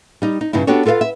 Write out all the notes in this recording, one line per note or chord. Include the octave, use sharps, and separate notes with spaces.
G3 D#4
D#4
G2 C#3 D#4 E4
B3 D4 F#4 G4 A4 C#5
F4 A4 B4 E5 F5
E5